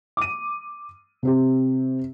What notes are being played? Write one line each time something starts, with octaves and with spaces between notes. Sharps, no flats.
D6 D#7
C3 C4 G4